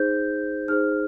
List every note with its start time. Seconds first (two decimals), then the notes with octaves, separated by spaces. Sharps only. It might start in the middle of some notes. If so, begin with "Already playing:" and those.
Already playing: D#4 G#4 C5 G6
0.68 D#4 G#4 C5 F6